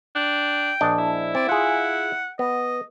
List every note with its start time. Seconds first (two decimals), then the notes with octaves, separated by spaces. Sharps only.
0.16 D4 G5
0.81 A#1 D4 D#5
0.98 E4
1.35 C4 D5
1.49 F4 G#4 F#5
2.39 B3 D#5